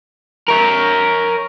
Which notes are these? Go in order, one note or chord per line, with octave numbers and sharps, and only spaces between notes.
A#4 C#5